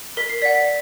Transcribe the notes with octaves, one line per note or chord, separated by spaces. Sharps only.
A#4 B6
C7
D5 F#5 B6
B6